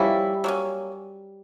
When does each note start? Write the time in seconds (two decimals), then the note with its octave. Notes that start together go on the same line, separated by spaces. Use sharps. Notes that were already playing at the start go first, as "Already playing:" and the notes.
Already playing: F3 G3 A#3 C#4 E4
0.44 F#3 A#3 C#4